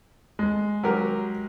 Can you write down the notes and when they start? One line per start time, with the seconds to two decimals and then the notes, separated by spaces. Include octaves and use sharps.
0.39 G#3
0.83 F#3 G4 A#4